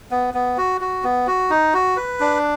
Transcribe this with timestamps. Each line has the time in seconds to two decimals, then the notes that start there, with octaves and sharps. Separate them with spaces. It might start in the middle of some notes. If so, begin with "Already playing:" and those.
0.11 B3
0.34 B3
0.58 F#4
0.81 F#4
1.04 B3
1.27 F#4
1.50 D#4
1.74 F#4
1.97 B4
2.20 D4